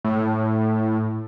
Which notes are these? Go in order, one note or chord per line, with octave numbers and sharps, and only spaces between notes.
A2